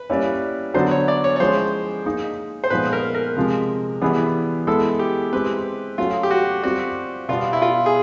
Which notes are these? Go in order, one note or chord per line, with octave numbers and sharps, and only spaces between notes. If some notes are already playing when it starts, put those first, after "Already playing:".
Already playing: B4
G3 A#3 C#4 E4
D3 F#3 B3 D4 C5
C#5
D5
C#5
C#5
F3 G#3 C#4 E4 C5
A#3 D#4 G#4
C5
A#2 F3 G#3 B3 D#4 B4
A#4
A#4
C3 F3 G#3
E3 G3 B3 E4 G#4
G#3 B3 E4 G#4 A4
G4
G#3 C4 E4 G4 B4
F#3 A3 C#4 F4 F#4
G4
F#4
G3 C4 F4 F#4
B2 G3 B3 F4
E4
F4
G#4